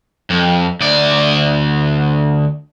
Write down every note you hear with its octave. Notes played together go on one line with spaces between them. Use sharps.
F2
D2 D5